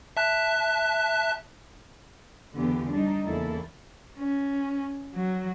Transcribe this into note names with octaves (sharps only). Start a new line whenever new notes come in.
E5 A5 F#6
E2 D3 E3 B3 G4
G3 D4 D#4
E2 C#3 A#3 E4 A4
C#4
F#3